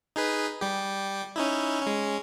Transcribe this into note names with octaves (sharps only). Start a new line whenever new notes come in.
D#4 G#4 B4
G3 G4
C#4 D#4 E4
G#3 C#4